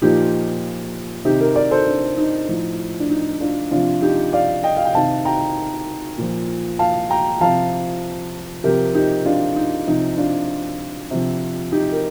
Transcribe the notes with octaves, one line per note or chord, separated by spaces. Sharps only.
A#2 F3 D#4 G4
C3 D#3 D#4 G4
G4 A#4
A#4 D5
A4 C5
D4
D#4
A2 F3
D4
D#4
D4 F4
C3 F3 D4 F4
D#4 G4
D5 F5
D#5 G5
F5
G5
C3 D#3 F5 A5
G5 A#5
A#2 F3
F5 A5
G5 A#5
C3 F3 F5 A5
C3 F3 G4 A#4
D#4 G4
D4 F4
D#4
C3 F3 D#4
D4 F4
C3 F3
D#4 G4
A#4